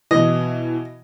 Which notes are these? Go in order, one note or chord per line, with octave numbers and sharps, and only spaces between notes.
B2 E3 D#5